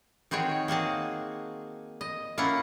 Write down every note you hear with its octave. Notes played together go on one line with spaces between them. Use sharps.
D#3 C4 F#4 G#4 C#5
A#3 F#4 G#4 A5
D#5
A#3 C#4 E4 F4 F#5